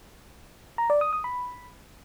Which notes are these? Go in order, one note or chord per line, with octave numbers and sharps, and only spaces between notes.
A#5
D5
D#6
D#6
B5